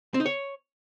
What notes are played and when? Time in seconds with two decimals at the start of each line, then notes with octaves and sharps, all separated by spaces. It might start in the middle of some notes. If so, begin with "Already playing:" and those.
0.14 C4
0.20 D#4
0.26 C#5